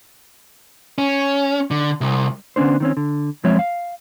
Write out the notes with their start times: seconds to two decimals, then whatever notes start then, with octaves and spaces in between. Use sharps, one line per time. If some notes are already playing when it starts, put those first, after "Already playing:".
0.98 C#4
1.71 D3
2.01 C2
2.56 D3 B3 C#4 D4 C5
2.80 D#3 C4 C#4
2.97 D3
3.44 F#2 F3 G#3 C4 C#5 E5
3.59 F5